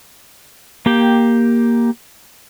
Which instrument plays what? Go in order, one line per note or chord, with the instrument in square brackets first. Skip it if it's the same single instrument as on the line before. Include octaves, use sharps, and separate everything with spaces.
[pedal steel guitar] A#3 G4 G5